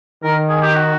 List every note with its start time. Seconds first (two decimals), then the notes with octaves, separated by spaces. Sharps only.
0.24 D#3 A#4
0.49 G#4
0.62 G4
0.75 F#4